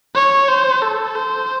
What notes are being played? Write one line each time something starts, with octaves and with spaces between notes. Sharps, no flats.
C#5
C5
A4
C5